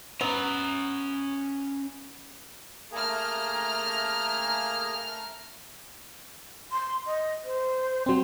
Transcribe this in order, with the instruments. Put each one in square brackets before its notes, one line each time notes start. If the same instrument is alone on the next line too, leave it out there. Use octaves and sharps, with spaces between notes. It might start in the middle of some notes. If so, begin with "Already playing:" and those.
[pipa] F#3 B3 [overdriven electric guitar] C#4 A#5
[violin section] A3 A#5 F6 [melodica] A#3 G#4
[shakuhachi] C6
D#5
C5
[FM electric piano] F#3 C4 [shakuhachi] C6